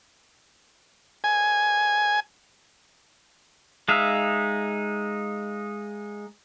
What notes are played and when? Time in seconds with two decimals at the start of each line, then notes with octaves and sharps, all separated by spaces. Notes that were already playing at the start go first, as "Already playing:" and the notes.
1.24 G#5
3.88 G#3 D#4 E5 F5